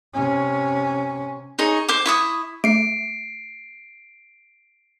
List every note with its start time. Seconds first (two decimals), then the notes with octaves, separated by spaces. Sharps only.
0.14 C3 C#4
1.59 D#4 G#4 C#5
1.89 C5 D6
2.06 E4 C#6 D#6
2.64 A3 C7 D7